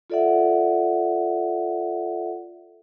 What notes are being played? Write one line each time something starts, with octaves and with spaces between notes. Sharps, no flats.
F4 A4 D5 E5 F#5